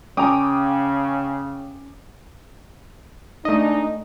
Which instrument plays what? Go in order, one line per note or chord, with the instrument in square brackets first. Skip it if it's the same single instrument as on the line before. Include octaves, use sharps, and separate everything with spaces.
[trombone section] C#3 [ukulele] C#4 A#5 [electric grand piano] G5 D6 D#6
[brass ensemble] G#3 D#4 [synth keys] A3 D#5 [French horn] D4